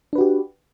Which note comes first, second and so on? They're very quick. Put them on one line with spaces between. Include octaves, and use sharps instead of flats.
D4 B4 F#4 G4